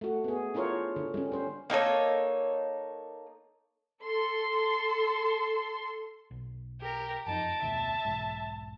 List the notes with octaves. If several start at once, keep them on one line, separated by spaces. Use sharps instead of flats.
A3 F#4
B3 G#4
D4 E4 F4 A#4 C5 C#5
D3
G3 C#4
C#4 C5
A#3 D#4 A4 C#5
A4 C6
B1
G4 A#4
F#1 F2 D#4 A5 D7
F1 D2 B2 E5
E1 B1 G#2